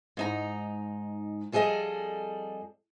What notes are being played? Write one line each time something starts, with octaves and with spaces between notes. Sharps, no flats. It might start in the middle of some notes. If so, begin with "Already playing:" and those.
G#2 D#4 A#5
F2 G3 G#4 A4 D#5